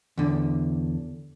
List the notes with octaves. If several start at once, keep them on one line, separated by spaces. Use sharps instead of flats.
E2 D3